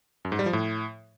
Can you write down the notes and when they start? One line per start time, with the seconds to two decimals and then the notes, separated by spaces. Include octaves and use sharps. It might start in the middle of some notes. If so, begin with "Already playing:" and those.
0.25 F#2
0.32 G#2
0.39 G3
0.46 F3
0.53 A2